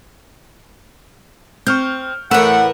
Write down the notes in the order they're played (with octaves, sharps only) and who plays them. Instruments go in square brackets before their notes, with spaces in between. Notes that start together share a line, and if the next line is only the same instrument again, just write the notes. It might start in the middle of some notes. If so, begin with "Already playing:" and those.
[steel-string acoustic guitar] C4 [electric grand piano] C#6 F6 G6
[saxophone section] A2 E3 F#5 [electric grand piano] A3 E6 E7 [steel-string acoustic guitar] A#4 B4